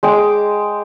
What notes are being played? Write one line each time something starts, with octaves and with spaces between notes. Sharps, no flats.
G#3 G5 D6